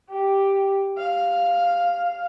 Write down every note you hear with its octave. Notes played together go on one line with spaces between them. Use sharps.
G4
F5